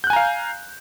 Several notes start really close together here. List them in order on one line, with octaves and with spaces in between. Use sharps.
G6 F#6 G#5 A#5 F5